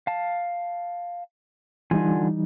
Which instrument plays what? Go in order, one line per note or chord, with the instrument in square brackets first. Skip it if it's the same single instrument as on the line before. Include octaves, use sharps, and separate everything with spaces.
[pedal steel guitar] F5 A5
[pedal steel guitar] D3 F4 G#5 [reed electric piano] E3 G3 D#4